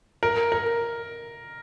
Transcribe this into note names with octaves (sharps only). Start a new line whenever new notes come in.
A#4
A#4